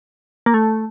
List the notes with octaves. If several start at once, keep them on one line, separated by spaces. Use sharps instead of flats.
A#3
A3